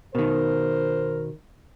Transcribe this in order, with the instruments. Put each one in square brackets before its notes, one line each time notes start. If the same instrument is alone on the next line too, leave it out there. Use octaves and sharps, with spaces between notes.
[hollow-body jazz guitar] B2 D#3 [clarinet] A#4 [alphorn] C5